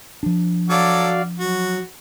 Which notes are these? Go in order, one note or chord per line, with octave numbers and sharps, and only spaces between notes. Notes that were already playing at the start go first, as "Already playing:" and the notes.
F3 D4
F#3 F#4 A4 D5 F5 D6
F#3 F#4